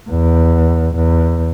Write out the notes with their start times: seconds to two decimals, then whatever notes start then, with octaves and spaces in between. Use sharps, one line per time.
0.10 E2
0.95 E2